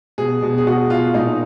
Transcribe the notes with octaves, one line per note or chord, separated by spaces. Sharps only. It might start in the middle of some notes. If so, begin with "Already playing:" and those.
B2 G#4
B2
G#4
B2 F#4
B2 F4
A#2 D#4